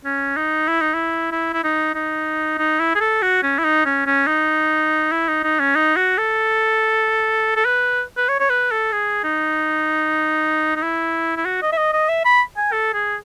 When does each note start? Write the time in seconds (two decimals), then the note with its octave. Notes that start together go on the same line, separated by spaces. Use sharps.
0.05 C#4
0.37 D#4
0.68 E4
0.81 D#4
0.94 E4
1.32 E4
1.53 E4
1.64 D#4
1.95 D#4
2.58 D#4
2.80 E4
2.95 G#4
3.00 A4
3.22 F#4
3.43 C#4
3.59 E4
3.64 D#4
3.85 C#4
4.06 C#4
4.27 D#4
5.12 E4
5.28 D#4
5.43 D#4
5.60 C#4
5.75 D#4
5.97 F#4
6.18 A4
7.56 A4
7.65 B4
8.17 B4
8.29 C#5
8.40 C#5
8.50 B4
8.71 A4
8.92 G#4
9.24 D#4
10.76 D#4
10.82 E4
11.37 E4
11.45 F#4
11.62 D#5
11.72 E5
11.77 D#5
11.93 D#5
12.09 E5
12.25 B5
12.57 G#5
12.72 A4
12.94 G#4